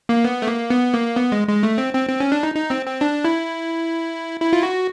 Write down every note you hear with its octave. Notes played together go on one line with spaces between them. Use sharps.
A#3
B3
A3
A#3
B3
A#3
B3
G#3
G#3
A3
C4
C4
C4
C#4
D4
D#4
D#4
C4
C4
D4
E4
E4
F4
F#4